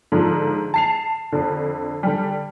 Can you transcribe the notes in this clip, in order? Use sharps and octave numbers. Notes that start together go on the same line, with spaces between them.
G#2 D3 F3
A5 C7 F7
F2 D3
D3 G3